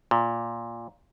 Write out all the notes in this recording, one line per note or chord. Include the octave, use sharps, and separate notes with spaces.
A#2